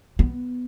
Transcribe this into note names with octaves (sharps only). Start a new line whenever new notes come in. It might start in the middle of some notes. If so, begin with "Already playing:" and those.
B3